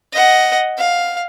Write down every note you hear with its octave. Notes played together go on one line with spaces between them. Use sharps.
D#5 F#5
F5